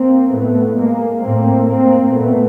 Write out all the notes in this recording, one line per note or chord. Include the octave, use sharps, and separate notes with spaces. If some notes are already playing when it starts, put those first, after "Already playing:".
Already playing: A#3 C4
A2 A3 B3
G#3 A#3
A2 A#3 C4
A#3 C4
A#2 A3 B3